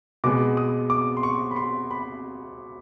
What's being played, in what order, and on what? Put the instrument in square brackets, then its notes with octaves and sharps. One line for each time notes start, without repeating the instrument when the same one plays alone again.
[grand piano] B2 G#3 B3 D6
D#6
D6
C6
C#6
B5
C6
B5